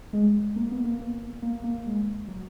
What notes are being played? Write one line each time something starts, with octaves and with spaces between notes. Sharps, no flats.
G#3
A#3
B3
A#3
B3
A#3
A#3
G#3
F#3